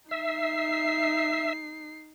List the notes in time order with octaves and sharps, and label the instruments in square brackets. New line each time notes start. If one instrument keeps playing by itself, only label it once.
[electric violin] D#4 C7 [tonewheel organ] E5